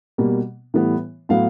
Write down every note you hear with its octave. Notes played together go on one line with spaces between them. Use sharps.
B2 G3 A#3
A2 E3 G3 B3
A2 F#3 B3 F5